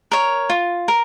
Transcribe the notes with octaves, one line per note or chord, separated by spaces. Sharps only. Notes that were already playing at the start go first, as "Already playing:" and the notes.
A#4 C#5
F4
A#4